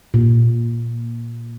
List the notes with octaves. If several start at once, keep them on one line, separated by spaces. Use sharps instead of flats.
A#2